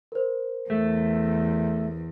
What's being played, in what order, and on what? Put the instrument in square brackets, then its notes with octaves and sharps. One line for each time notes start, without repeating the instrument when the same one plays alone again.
[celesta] A#4 C5
[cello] E2 [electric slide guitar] A3